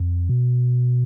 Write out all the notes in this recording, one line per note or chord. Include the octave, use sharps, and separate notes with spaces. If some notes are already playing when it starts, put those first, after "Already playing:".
Already playing: F2
B2